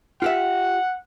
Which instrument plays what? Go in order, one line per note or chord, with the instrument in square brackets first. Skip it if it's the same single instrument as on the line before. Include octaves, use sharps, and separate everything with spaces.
[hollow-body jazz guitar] F4 G4 E5 [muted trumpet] F#5